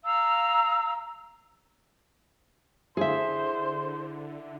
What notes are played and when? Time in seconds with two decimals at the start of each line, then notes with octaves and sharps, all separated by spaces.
0.03 F5 A#5 E6
2.97 D3 E4 G#4 C5 E5